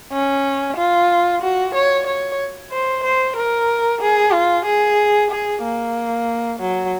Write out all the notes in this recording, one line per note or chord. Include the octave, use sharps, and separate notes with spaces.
C#4
F4
F#4
C#5
C#5
C5
C5
A#4
G#4
F4
G#4
G#4
A#3
F#3